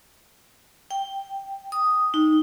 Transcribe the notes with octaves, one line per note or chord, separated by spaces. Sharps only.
G5
D#6
D#4